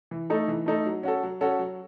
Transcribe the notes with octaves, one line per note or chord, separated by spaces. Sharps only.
E3
A3 D#4 A4
E3
A3 D#4 A4
F#3
C#4 F#4 A4
F#3
C#4 F#4 A4
F#3